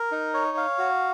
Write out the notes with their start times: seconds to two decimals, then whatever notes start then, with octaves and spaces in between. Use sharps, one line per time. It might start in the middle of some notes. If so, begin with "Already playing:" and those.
Already playing: A#4
0.12 D#4
0.34 C#5
0.57 F5
0.78 F#4